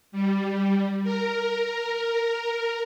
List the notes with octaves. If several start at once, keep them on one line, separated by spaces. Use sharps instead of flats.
G3
A#4